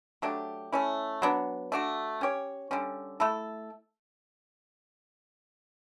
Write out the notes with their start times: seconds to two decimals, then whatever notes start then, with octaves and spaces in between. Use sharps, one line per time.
0.22 F#3 A3 D4 G4
0.72 A3 C#4 E4
1.22 F#3 B3 D4
1.72 A3 D4 F#4
2.21 C#4 G4 C#5
2.71 D3 G3 C#4
3.20 A3 E4 A4